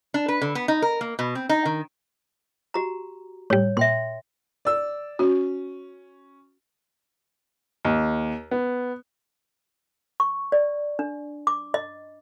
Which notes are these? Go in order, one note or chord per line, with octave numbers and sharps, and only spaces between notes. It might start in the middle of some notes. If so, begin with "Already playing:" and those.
D4
B4
D3
B3
D#4
A#4
A#3
B2
C4
D#4
D#3
F#4 G4 A#5
A2 G3 C#5
A#2 E5 G5 C6
D5 E6
C#4 F#4
D#2
B3
C#6
D5
D4
D6
D#5